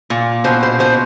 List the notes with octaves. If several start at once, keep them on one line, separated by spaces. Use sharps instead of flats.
A#2
B2 C5
C5
B2 C5